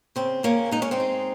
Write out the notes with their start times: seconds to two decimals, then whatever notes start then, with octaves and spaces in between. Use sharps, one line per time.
0.16 C#3 C4
0.43 C#3 A#3 C#4
0.71 G#3 D#4
0.82 C#4
0.91 C4 D#4
1.00 G#3